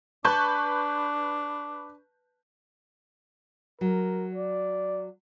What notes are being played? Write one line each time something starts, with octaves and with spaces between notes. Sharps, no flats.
D4 B4 A5 C#6 G6
F#3 A#4
D5